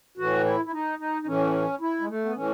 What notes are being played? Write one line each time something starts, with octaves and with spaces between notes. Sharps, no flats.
A2 E3 F#4
E4
E4
D#4
D#4
D#4
A2 E3 C#4
E4
G#3
A3
B3
A2 E3 C#4